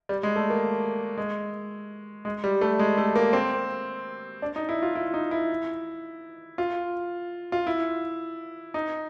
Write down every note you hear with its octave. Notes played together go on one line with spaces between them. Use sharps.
G3
G#3
A3
A#3
G#3
G#3
G3
A3
G#3
A3
A#3
C4
D4
D#4
E4
F4
E4
D#4
E4
F4
F4
E4
D#4